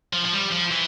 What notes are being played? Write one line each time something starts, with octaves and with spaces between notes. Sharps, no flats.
F3
F3
G3
F3
E3